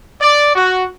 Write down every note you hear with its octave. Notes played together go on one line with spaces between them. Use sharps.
D5
F#4